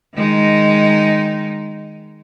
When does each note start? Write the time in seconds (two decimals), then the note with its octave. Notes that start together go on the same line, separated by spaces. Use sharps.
0.15 D#3 G#3 D#4